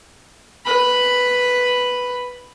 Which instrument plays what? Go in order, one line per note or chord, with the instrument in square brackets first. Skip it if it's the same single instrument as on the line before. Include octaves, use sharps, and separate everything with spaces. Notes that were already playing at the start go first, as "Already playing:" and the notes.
[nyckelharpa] B4 B5